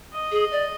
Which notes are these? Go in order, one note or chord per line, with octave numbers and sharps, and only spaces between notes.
D#5
G#4
D5